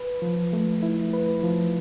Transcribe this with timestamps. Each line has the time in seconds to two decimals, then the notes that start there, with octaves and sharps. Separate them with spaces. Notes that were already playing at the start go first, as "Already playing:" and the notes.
Already playing: B4
0.22 F3
0.53 A3
0.82 E4
1.13 B4
1.43 F3